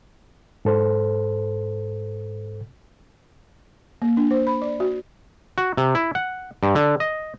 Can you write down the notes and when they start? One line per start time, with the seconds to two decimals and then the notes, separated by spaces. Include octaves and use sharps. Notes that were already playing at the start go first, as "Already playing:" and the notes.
0.65 G#2 A4 C5
4.02 A#3
4.17 D4
4.31 C5
4.47 B5
4.62 D5
4.80 F#4
5.58 F#4
5.77 C3
5.95 E4
6.15 F#5
6.63 G2
6.75 D3
7.00 D#5